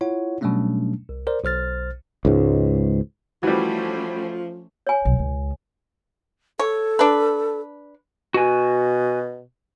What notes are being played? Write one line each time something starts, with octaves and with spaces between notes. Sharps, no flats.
E4 F4 C#5 F#5
B2 F#3 G3 A3 C#4 D4
C2
A#4 C5 D5
B1 C5 F6 A6
C#2 G#2
E3 F3 G3 A3 C#4 F#4 C5
C#5 G#5
B1
C#2
A4 C#5
D4 B4
B2 F#4 G#5